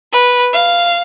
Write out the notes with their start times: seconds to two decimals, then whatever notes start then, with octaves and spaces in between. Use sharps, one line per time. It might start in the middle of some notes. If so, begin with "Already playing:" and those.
0.13 B4
0.53 F5